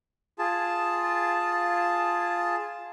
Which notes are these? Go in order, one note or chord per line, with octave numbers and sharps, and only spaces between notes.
F4 G#4 A5